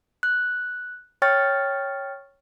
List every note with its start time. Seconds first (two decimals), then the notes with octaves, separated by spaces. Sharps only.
0.23 F#6
1.22 C#5 G5 C#6 F6 A6